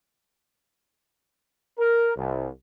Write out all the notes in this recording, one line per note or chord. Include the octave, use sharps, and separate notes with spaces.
A#4
C2